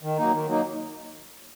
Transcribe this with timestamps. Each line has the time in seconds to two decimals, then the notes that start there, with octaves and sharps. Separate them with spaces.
0.03 D#3
0.17 F#3 A#3 D#4
0.32 D#3
0.47 F#3 A#3 D#4